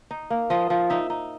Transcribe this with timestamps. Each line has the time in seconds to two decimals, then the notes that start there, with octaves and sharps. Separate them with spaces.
0.11 D#4
0.30 A#3
0.50 F3 D#5
0.70 F3
0.90 D#4 E5
1.10 D#4